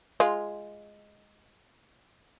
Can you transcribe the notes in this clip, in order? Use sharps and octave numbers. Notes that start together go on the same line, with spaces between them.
G#3 F4